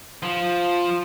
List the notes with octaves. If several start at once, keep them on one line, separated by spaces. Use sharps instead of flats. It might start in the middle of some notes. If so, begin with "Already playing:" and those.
F3